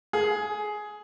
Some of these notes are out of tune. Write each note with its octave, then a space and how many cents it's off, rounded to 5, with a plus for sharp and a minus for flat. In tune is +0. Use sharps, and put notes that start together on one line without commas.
G#4 +15 G#5 +35